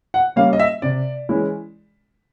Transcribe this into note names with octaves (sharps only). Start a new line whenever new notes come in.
F#5
G3 A#3 C#4 F5
D#5
E5
C3 D5
E3 G#3 C#4 E4